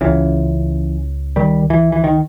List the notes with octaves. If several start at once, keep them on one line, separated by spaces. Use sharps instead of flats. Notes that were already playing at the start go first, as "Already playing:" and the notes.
C#2 C#3 E3
D#3 G3
E3
E3
D#3